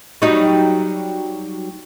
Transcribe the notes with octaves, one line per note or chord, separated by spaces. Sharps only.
F#3 G3 D#4